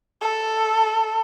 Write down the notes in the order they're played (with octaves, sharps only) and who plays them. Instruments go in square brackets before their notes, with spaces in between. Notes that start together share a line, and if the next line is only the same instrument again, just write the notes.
[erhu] A4